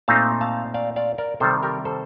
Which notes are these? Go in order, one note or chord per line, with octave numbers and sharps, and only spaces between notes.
A#2 A3 C4 D#4 F5 A5
F5 A5
D5 F5
D5 F5
A#4 D5
C3 D#3 G3 A4 C5
G4 A#4
A4 C5